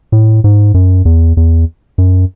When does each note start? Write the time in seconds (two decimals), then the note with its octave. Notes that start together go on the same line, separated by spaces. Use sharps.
0.12 A2
0.44 G#2
0.74 F#2
1.05 E2
1.37 E2
1.98 F#2